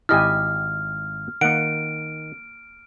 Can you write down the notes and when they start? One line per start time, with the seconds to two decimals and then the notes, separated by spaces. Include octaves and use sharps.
0.09 G#1 E4 G4 D#5 G#5 A5 F6
1.41 D#3 A#3 F#5 D7